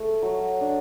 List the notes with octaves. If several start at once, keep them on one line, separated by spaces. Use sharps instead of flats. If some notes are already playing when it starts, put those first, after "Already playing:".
Already playing: A3 A4
F#3
D4